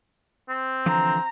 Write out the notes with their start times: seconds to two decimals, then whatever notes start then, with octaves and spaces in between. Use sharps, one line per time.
0.49 C4
0.86 D3 E3 F3 A#5